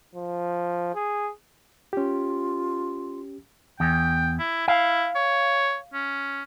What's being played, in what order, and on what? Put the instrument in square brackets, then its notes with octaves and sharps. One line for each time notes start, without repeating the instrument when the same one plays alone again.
[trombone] F3
G#4
[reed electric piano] C#4 G4 [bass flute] F4
[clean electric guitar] E2 [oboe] G5
[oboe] E4
[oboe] E4 [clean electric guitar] F5
[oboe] C#5
C#4